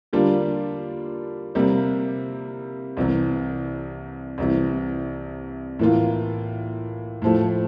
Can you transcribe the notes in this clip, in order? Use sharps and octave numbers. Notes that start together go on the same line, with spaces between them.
D3 G3 A#3 D4 F4
C3 G3 A#3
C2 C3 E3
C2 C3 E3
A2 E3 A#3 F4
A2 F3 A3